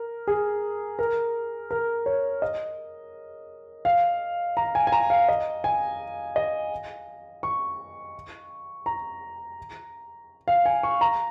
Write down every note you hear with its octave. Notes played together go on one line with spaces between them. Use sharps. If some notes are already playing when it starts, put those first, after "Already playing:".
Already playing: A#4
G#4
A#4
A#4
C#5
D#5
F5
A#5
G#5
G#5
A#5
F5
D#5
G#5
D#5
C#6
A#5
F5
G#5
C#6
A#5